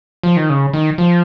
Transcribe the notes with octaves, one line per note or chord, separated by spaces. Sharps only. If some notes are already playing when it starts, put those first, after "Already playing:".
F3
D#3
C#3
D#3
F3